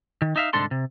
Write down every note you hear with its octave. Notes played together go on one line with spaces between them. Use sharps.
D#3
D#4 E5 F5
C2 G#2 D3 D4 A4 C6
C3